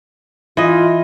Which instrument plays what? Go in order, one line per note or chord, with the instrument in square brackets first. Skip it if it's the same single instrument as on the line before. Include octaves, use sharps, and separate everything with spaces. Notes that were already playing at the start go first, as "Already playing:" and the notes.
[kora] E3 D#5 [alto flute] F4